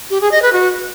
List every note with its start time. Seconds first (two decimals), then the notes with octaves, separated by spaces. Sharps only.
0.10 G4
0.21 G#4
0.32 D#5
0.42 B4
0.53 F#4